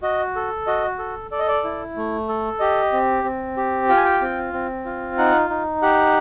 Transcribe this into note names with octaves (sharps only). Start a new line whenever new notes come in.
F#4 D#5
A4
F#4 D#5
A4
A4 D5
D#5
D5
E4
A3
A4
G4 D#5
C4
C4
G4
F4 G5
G#5
G5
C4
C4
F4
D#4 F#5
D#4
G4 F#5